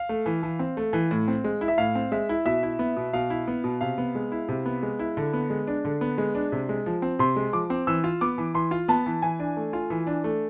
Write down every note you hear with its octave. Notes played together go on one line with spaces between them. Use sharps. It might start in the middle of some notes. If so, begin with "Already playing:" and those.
Already playing: F5
A3
E3
E3
C4
A3
E3
A2
C4
G#3
E4
E5
A2 F5
C4
G#3 E5
E4
B2 E5
E4
B3
B2
B2 F5
E4
B3
B2
C3 F5
B3
G#3
E4
C3
B3
G#3
E4
D3
B3
G#3
D4
D3
B3
G#3
D4
C3
G#3
F3
C4
C3 C6
G#3
F3 D6
C4
E3 E6
F4
B3 D6
E3
E3 C6
F4
B3 A5
E3
E3 G#5
D4
A3
F4
E3
D4
A3